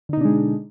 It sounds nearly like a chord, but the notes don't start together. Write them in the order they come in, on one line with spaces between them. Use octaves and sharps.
D3 D#4 B2 D4 G#3